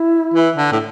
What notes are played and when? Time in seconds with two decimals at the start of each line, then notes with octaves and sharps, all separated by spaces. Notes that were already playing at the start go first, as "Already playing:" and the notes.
Already playing: E4
0.34 E3
0.56 D3
0.72 A2